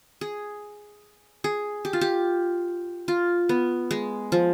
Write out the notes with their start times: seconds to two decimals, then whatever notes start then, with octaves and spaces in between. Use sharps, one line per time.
0.21 G#4
1.44 G#4
1.85 G4
1.93 F4
2.01 G4
3.08 F4
3.49 B3
3.91 G#3
4.32 F3